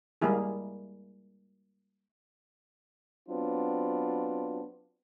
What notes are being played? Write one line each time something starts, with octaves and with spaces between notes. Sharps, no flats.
G3 G#3 A#3 E4 G#4
F#3 B3 C4 D4 F4